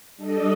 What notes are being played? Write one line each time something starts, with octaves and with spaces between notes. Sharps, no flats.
G3 D4 A4 D#5